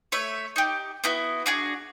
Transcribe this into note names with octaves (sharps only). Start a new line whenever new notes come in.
A3 C#5 E5
D#4 G4
B3 E4 F#4
D4 F#4 G#4